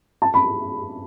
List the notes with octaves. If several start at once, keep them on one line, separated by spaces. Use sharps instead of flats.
A5
B5